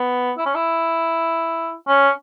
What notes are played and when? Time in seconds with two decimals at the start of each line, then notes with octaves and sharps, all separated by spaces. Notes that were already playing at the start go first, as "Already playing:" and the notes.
Already playing: B3
0.37 E4
0.46 C#4
0.55 E4
1.88 C#4